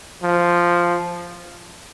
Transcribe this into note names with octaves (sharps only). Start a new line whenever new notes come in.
F3